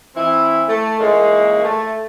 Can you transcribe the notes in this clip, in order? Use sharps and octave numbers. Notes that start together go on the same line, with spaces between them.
E3 C4 E4
A3
A#2 E3 G#3 A#3 C#4 E4
A3